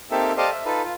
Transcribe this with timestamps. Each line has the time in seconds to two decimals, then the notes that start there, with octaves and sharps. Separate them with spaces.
0.11 A#3 C4 D#4 G4 A4 E5
0.37 G4 A4 C5 D5 D#5 F5
0.52 E5
0.65 D#4 F4 A4 B4
0.83 F4